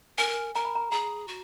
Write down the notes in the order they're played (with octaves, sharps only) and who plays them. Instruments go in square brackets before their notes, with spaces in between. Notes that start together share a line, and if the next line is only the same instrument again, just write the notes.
[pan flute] A#4 [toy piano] G#5
[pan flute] A#4 [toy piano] A#5
[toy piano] B5
A#5
[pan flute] G#4 [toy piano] A#5
[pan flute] F#4